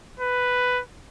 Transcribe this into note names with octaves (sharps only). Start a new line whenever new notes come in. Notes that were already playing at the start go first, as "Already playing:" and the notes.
B4